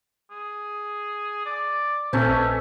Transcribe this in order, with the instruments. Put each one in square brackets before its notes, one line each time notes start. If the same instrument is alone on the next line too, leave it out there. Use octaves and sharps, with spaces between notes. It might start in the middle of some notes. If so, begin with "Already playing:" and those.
[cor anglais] G#4
D5
[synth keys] A#2 A#5 [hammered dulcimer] E3 A3 C#4 [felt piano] C4 [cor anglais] A#4
[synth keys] A#1 D#5 [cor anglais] E5